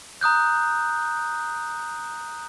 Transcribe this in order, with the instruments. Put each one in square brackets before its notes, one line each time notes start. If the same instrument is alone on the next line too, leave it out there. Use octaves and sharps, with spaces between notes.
[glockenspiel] A#5 D#6 F#6 G6